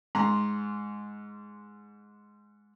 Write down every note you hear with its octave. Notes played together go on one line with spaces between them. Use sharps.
G#2 A#5 C6